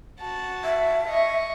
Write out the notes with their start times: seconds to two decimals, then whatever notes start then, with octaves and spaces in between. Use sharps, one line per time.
0.20 F#4 A5
0.65 E5
1.07 D#5 C#6